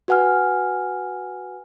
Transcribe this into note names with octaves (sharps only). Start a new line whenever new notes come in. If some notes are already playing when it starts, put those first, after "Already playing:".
F#4 B4 F#5 G#5 F6